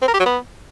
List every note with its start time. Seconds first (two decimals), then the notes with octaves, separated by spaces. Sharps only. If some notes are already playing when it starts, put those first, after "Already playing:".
0.02 C4
0.08 A#4
0.14 G4
0.20 F#3
0.26 B3